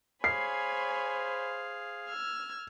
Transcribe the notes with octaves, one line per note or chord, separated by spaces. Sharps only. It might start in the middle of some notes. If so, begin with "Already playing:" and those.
G#4 C5 C#5 F5 G#5 B5 C7
E6 F6 G#6